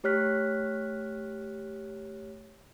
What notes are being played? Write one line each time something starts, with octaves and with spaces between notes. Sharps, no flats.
A3 G4 C#5 F6 F#6 B6